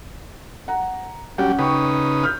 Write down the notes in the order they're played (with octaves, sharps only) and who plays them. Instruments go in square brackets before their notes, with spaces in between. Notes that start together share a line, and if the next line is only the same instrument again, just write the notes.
[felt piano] F#5 A#5
[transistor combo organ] F#3 G3 G4 [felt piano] C#4 F#5
[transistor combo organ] C#3 D#4 B4 [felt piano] G5 C#6
[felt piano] F6 G6